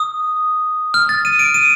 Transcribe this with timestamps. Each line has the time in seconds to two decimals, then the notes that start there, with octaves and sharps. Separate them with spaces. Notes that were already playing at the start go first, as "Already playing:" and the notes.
Already playing: D#6
0.94 F6
1.09 A6
1.25 D#7
1.39 D7
1.54 D#7